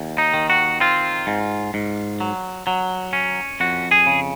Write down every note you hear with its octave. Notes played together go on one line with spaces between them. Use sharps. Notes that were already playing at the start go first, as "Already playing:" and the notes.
Already playing: D#2
D#4
D#3
F#4
C4 F4
G#2
G#2
F#3
F#3
C#4
F2 F#4
G#4
C#3